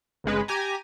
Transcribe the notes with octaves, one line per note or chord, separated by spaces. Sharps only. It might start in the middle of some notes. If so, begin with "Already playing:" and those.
G#1 C#3 G#3 B4
G4 G#5 A#5